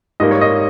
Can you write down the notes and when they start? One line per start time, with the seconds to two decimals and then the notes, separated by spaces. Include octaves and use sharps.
0.20 G#2 G3 A#3 D#5
0.31 C#5
0.41 D#5